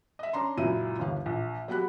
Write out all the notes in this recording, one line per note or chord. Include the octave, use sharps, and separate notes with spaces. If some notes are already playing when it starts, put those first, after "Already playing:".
D#5 E5
C#4 D4 A#5 C6
C#2 F#2 A#2 E4 D#7
G1 D#2 F5
A#1
F#3 A#3 G4 F#5 B5 F#6